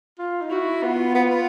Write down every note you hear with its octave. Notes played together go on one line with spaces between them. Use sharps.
F4
D#4
E4 F#4
B3 F4
B3
B3